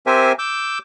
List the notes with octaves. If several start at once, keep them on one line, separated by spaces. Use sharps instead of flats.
C4 G4 A#4 C5 E5 G#5
D6 E6 G6